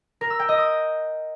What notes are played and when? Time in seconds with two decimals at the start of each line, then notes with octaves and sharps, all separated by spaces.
0.21 A#4
0.30 E6
0.39 G5
0.49 D#5
0.58 D#6